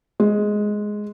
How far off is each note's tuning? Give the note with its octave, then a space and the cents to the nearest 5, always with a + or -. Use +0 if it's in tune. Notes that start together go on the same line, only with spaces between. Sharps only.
G#3 +5